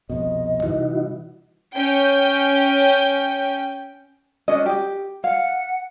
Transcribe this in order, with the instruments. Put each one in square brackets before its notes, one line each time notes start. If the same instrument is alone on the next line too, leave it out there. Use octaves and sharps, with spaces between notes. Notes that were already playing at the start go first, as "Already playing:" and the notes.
[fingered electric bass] C2 F2 B2 [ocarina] D#5
[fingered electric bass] C3 E3 G3 [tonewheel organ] D#4 E4 F#4
[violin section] C#4 G5
[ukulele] C#4 D4 D#5
G4
[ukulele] F5 [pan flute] F#5